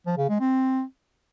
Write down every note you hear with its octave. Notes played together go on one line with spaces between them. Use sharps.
F3
C#3
G#3
C4